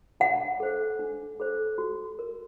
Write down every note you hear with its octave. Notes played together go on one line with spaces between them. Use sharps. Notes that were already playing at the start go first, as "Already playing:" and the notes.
D4 F#5
A4 C5
D4
A4 C5
F#4
A#4